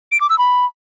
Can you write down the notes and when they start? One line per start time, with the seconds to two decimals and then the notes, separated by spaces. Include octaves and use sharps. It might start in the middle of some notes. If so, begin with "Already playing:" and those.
0.12 D7
0.21 D6
0.30 E6
0.39 B5